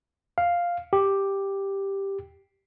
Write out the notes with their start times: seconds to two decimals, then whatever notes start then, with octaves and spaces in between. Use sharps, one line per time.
0.38 F5
0.93 G4